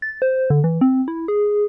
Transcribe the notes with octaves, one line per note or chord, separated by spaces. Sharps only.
A6
C5
D3
E3
C4
E4
G#4